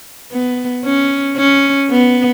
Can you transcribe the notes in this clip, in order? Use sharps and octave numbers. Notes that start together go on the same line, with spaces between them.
B3
C#4
C#4
B3